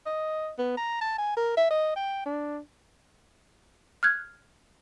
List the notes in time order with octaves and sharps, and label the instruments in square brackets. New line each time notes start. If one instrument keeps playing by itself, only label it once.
[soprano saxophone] D#5
B3
A#5
A5
G#5
A#4
E5
D#5
G5
D4
[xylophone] F6 F#6 G#6